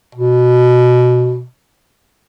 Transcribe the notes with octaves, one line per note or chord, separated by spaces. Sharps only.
B2